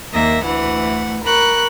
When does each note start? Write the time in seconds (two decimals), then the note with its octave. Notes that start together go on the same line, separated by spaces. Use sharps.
0.11 D#2 A#3 E5 A#6
0.43 D2 E3 A3 F#5
1.23 A#4 B5 C#6 F#6